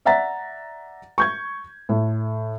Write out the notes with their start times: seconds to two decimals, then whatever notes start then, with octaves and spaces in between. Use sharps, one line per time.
0.05 D5 E5 F#5 A#5 A6 B6
1.18 C#6 G6 G#6
1.89 A2